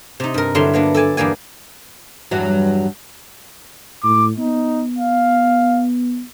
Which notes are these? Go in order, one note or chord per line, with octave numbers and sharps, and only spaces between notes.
C3 D#4
G2 A#4
G2 D3 F#3 E4 E5 C6
A#3 B3 D4
A4 D5 G#5 A5
E2 G2 A#3 D5 G#5
E2 G2 F#3
A2 D6
B3 D#4
F5